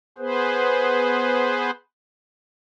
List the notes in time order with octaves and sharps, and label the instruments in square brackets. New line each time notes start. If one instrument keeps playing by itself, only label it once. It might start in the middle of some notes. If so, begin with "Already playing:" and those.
[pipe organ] B3 G#4 B4 C5